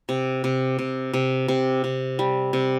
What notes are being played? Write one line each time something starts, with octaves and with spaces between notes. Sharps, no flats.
C3
C3
C3
C3
C3
C3
G3
C3